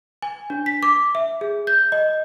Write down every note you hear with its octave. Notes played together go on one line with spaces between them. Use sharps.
G#5
D4
B6
D6
E5
G#4
G6
D#5